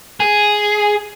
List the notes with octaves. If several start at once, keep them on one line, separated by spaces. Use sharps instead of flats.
G#4